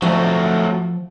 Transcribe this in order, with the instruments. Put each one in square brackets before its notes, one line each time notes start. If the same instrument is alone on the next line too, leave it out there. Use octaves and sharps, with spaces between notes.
[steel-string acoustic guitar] D2 C4 F#4 [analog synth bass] F3 [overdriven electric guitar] F#3 A3